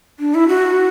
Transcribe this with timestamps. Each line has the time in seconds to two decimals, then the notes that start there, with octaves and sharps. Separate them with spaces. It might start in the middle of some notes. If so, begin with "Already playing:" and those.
0.20 D4
0.34 E4
0.49 F#4